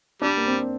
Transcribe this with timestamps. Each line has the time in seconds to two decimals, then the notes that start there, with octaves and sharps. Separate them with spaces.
0.22 G3 D4
0.37 A#3
0.47 C4